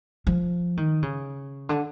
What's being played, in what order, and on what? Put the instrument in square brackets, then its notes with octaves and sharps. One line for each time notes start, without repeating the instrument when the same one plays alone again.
[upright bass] F3
D#3
C#3
D3